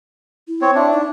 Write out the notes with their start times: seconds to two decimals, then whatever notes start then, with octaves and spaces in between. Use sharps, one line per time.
0.48 E4
0.62 C4 C#5
0.75 D4 E5
0.93 D#4